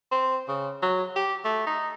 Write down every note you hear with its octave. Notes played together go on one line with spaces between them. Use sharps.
C4
C#3
F#3
G4
A3
D#4